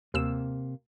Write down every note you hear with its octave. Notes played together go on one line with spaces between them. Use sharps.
D#2 C3 A#3 E6 E7